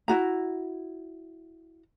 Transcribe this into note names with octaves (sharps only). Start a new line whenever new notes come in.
E4 F#4 A#5